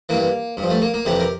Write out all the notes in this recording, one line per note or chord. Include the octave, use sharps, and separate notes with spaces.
G2 E3 A#3
G2
F3
A3
A#3
A#3
F2 C3 E3 G4
A#4